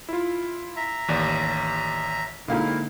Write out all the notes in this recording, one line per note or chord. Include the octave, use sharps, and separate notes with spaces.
E4 F4
E5 A#5
A1 D#2 D5
G#2 D3 A#3 D#4 E4 F5 G5